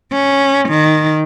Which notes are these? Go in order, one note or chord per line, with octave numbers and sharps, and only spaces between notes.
C#4
D#3